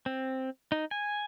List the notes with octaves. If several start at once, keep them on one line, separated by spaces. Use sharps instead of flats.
C4
D#4
G#5